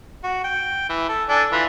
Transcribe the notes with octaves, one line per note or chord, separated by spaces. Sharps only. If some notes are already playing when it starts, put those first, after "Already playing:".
F#4
G5
E3
A4
D4 A4 G#5
E3 F4 B4